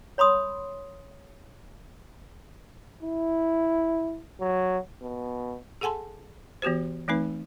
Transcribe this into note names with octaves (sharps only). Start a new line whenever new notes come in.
C#5 B5 C6 D#6
E4
F#3
B2
G#4 A4 F#5 G#5 A5 C6
E3 B3 F#4 G4 C5
E3 A3 C4 D#4 B4